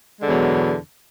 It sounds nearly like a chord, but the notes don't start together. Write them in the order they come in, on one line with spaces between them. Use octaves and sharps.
G#3 D3 E2 F#3 B2